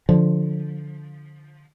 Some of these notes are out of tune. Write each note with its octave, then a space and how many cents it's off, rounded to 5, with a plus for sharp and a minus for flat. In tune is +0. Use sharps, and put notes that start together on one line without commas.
D3 +0 F3 +10